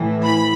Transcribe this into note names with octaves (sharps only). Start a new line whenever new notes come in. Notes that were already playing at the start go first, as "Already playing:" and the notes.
Already playing: A2 E3
B5